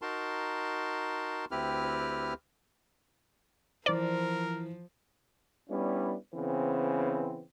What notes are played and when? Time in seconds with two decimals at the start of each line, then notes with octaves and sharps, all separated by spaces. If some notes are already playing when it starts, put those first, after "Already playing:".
0.02 D#4 F#4 A#4 A5 C6
1.51 D2 C4 E4 G4 B4 F6
3.86 E3 F3 A#4 C5 D5
5.70 G3 B3 C#4 D4 E4
6.35 C#3 E3 B3 C4